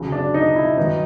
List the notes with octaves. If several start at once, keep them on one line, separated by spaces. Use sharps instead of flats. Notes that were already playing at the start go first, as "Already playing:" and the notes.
Already playing: D2 C#3 F#3
D4
D#4
E4
G2 D#3 F#3 D#4